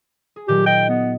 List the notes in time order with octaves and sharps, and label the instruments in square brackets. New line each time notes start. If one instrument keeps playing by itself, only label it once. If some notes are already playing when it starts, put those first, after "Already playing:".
[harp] G#4
[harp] A#2 D#3 F#3 [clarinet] G4
[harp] D#5 [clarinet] G5
[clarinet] B3